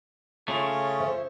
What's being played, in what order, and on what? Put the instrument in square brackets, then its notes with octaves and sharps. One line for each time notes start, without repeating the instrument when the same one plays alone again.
[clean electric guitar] C#3 A3 [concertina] C#4 F4 C#5
[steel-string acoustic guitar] C5 E5